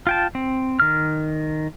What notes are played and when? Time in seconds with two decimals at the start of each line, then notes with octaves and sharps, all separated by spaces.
0.07 F4 G5 A5
0.35 C4
0.80 D#3 F6